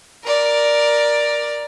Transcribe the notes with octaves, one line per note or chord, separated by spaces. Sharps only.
A#4 D5